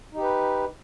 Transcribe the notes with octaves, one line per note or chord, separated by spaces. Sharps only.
D#4 G4 B4